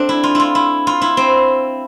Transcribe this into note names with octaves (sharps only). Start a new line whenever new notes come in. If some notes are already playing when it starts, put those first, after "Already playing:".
Already playing: A3 C4 D4
E4
F4
E4 F4
E4
F4
E4
C4